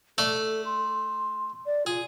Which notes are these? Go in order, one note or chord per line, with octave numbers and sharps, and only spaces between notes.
A3 A4 D5
C6
D5
F4 G#4